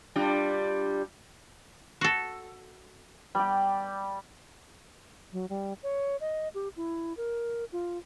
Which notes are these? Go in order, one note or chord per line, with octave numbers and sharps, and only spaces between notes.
G3 D4 F4
F#4 A4
G3 G4
F#3
G3
C#5
D#5
G4
E4
A#4
F4